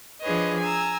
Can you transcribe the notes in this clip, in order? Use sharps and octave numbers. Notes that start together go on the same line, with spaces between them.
F3 D4 G#4 B4 C#5 D#5
G#5 A#5 E6